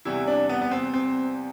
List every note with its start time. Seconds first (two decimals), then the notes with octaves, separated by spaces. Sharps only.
0.05 E2 C3 E3 G3 E4
0.28 D4
0.49 B3
0.62 B3
0.71 C4
0.94 C4